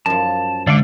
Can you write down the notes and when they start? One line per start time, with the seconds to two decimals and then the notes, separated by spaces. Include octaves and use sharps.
0.06 F#2 F3 A5
0.67 D3 G#3 D5 F5 D6